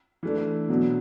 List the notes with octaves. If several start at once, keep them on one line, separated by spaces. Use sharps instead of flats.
E3 A3 D4
B2 F#3 B3 D4